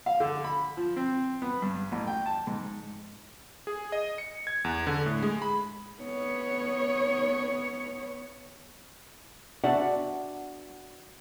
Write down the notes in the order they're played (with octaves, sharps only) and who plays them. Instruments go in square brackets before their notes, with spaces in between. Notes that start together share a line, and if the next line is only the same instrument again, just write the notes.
[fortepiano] F5
D3
B5
F3
C4
B3
G2
A1
G5
A5
G#2
[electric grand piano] G#4
D#5
C#7
G#6
E2
D3
A2
G#3
B5
[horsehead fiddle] B3 C#5
[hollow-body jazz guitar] B3 D4 F#4 D5 E5 F#5